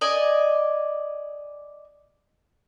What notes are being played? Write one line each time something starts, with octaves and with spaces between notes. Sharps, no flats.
D5 D#5 G#5